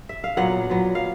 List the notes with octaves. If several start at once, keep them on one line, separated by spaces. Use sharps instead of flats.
E5
F5
A#2 F#3 B3 F#5
A#2 F#3 B3
F5